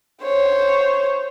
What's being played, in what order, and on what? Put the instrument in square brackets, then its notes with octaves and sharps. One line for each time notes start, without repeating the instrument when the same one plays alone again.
[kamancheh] C5 C#5